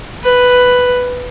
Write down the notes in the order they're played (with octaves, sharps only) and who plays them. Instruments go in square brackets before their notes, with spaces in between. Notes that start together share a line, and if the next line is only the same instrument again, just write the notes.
[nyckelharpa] B4